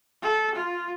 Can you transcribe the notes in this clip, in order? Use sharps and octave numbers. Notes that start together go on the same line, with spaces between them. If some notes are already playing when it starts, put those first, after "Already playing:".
A4
F4